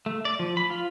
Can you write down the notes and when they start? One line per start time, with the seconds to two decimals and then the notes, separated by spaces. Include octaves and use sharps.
0.06 A3
0.25 D5
0.39 F3
0.57 B5
0.70 F4